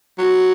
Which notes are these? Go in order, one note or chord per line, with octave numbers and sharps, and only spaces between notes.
F#3